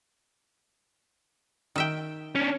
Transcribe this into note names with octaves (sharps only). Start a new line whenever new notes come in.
D#3 E5 G5
C#4 D4